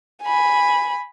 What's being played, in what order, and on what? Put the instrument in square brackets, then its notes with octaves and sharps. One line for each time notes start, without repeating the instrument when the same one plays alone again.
[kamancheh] G#5 B5